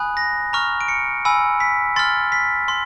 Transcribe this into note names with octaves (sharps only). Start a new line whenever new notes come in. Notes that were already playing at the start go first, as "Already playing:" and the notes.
Already playing: G#5 B5 D#6 F#6
A#6
A#5 C#6 F6
D7
C#7
G#5 B5 E6
B6
C6 F6 A6
B6
C6